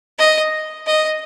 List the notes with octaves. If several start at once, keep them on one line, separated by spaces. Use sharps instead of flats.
D#5
D#5